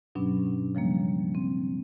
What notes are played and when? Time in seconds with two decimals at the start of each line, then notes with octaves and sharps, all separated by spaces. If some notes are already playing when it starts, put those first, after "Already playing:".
0.15 G2 B2 F#3 C#4 D4
0.75 C#3 F3 G3 A#3
1.35 C4